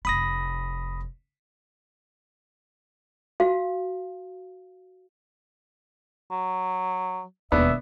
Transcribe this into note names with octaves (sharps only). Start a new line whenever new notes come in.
F1 F4 B5 D#6 A#6
F#4 F5
F#3
E1 D#2 B3 D4 E5